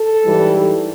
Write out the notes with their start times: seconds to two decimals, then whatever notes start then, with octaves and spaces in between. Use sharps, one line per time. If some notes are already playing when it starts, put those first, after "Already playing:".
Already playing: A4
0.24 G#2 E3 G3